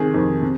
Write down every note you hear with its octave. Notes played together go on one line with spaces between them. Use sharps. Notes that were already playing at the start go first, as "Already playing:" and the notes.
Already playing: C3 D#3 G#4
F2 C3 D#3
C3